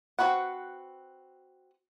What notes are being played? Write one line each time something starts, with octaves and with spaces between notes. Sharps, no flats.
C4 D#4 F#4 B4 F#5